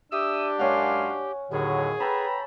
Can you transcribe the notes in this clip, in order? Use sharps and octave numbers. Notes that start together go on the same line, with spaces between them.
D4 G4 E5 D#6 E6
F#2 G#3 C#4 F5 F#5
D#2 A2 D3 F#3 G#4
A4 B4 G5 A#5 B5